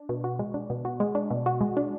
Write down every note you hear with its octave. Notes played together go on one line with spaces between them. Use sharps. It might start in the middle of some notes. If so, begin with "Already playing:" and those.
Already playing: D4
B2
F#4
G#3
D4
B2
F#4
G#3
D4
B2
F#4
G#3
D4